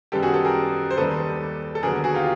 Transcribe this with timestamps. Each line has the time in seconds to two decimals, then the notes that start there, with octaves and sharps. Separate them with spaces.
0.12 F#2 D#3 G3 B3 G4 A4
0.23 F#4 G#4
0.34 G4 A4
0.45 G#4 A#4
0.91 C5
0.97 D#2 D#3 G3 A4 B4
1.75 A4
1.83 D#2 D3 F#3 B3 G#4 A#4
2.04 F#4 G#4
2.14 F4 G4